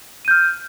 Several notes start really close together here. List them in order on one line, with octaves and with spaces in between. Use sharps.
D#7 G6 F6